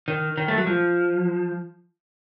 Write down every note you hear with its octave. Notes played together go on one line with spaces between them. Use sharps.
D#3
D#3
A3
F#3
F3